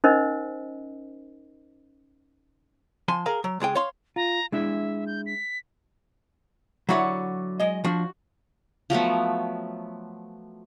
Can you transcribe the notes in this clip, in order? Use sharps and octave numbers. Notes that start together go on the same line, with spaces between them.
C#4 D#4 A#4 C5 D#5
F3 G#5 C6
G#4 A#4 F5
F#3
C#2 G#3 G#4 G5
C#5 F5 C6
F4 A#5
G#3 D4 E4 E5
G6
B6
D3 F#3 E4 F#4 C#5 F#5
G#3 D#5
F3 D4 F#4
F3 F#3 A3 B3